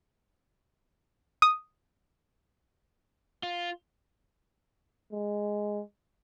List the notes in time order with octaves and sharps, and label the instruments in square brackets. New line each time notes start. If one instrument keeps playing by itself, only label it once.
[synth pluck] D#6
[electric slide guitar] F4
[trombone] G#3